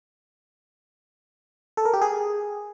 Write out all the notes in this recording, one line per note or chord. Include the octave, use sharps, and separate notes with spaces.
A4
A#4
G4
G#4